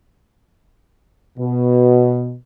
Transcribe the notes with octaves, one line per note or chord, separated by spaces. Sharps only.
B2